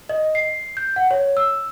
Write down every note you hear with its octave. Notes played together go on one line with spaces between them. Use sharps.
D#5
C7
G6
F#5
C#5
E6